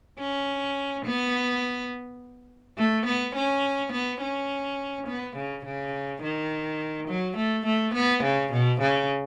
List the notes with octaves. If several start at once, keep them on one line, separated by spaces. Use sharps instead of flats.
C#4
B3
A3
B3
C#4
B3
C#4
B3
C#3
C#3
D#3
F#3
A3
A3
B3
C#3
B2
C#3